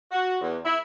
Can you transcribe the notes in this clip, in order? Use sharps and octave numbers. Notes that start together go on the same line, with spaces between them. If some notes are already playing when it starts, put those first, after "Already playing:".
F#4
E2
E4